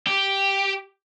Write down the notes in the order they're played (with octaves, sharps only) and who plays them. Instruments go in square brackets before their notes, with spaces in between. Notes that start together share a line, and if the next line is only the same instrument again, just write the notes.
[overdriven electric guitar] G4